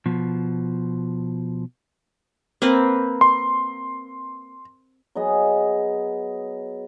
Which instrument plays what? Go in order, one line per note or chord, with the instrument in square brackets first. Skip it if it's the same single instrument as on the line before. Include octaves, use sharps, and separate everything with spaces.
[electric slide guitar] B2 F3
[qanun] A#3 C4 B4
[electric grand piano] C6
[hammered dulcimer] F#3 B3 G#4 D#5